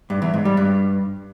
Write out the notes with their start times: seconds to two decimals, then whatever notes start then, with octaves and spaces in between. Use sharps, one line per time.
0.10 G2
0.22 E2
0.34 G#2
0.45 G3
0.57 G2